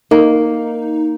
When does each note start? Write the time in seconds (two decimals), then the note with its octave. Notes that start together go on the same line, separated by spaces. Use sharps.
0.11 A#3 D#4